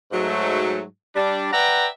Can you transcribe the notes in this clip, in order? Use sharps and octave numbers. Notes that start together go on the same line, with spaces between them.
G#2 F#3 A3
G3 D4
B4 D5 E5 F#5 G5 A#5